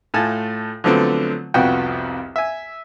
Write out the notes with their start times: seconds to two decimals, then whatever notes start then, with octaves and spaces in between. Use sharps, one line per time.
0.14 A2 A3 F4 A4 G#5 A5
0.84 D3 F3 F#3 A3 B3 C4
1.54 C2 F2 B3 F#4 G5
2.36 E5 G#5